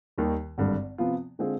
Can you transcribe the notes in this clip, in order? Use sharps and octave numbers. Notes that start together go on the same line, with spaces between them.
D#2 D#3 G3
G#1 G2 D3
C3 F3 B3 F4
D3 G#3 C4 F4 G#4